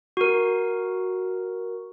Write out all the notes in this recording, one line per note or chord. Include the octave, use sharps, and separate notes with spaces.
F#4 A#4